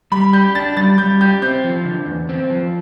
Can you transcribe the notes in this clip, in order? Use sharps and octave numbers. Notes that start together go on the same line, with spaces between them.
G3 B5
G4 G6
D4 A6
G3 A6
G3 G6
G4 G6
C4 G6
F3
D3
E2
C4
F3